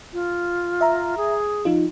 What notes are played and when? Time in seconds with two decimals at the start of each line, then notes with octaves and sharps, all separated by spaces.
0.13 F4
0.81 E5 A#5
1.17 G#4
1.65 F3 D#4 F4